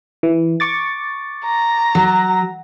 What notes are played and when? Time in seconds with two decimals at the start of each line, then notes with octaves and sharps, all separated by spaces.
0.23 E3
0.60 C#6 D6 A6
1.45 A#5
1.95 F#3